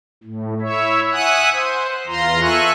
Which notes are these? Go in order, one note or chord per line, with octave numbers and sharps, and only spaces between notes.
A2
E4 C#5 E5
E5 F#5 G#5 D#6 F#6
C5
E2 F4 A#5 C6
A4 E5 G#5 C#6 F#6